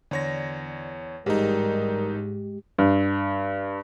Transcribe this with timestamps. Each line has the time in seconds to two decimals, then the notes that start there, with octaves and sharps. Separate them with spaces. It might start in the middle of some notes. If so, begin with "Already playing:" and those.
0.11 E2 D3 C#5 A#6
1.26 A1 G#2 G3 G#3 D#4 G4 A#4
2.78 G2